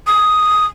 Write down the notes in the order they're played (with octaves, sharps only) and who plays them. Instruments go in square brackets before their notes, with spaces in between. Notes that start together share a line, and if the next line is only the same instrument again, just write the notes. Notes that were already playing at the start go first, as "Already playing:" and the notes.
[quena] D#6